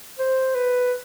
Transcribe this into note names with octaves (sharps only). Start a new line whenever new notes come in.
C5
B4